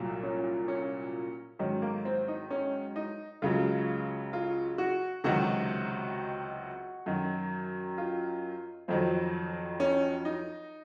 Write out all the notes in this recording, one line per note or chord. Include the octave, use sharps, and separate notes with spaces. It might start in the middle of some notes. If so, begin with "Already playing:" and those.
Already playing: C2 A#2 F#3
C#4
C#4
G#2 D#3 F#3 C#4
A#3
C4
D#4
C#4
D#4
C#2 C#3 F#3 F4
F4
F#4
C#2 C3 D#3 F#3 F#4
F#2 D#3 F#3
F4
F2 D#3 F#3 C4
C#4
D#4